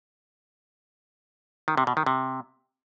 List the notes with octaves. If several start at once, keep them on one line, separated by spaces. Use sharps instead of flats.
D#3
C3
B2
D#3
C3